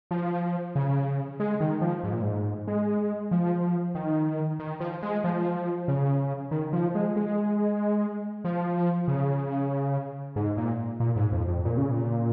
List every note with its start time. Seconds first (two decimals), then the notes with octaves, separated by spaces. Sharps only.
0.11 F3
0.76 C#3
1.40 G#3
1.60 D#3
1.81 F3
2.04 G#2
2.13 A#2
2.22 G#2
2.67 G#3
3.31 F3
3.95 D#3
4.59 D#3
4.80 F3
5.02 G#3
5.24 F3
5.88 C#3
6.51 D#3
6.73 F3
6.95 G#3
7.16 G#3
8.45 F3
9.08 C#3
10.36 G#2
10.57 A#2
11.00 A#2
11.16 G#2
11.32 F2
11.48 F2
11.65 A#2
11.77 C#3
11.91 A#2